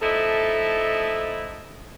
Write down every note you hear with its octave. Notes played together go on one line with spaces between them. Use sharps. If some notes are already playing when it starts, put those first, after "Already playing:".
F3 A3 D#4 E4 A4 D#5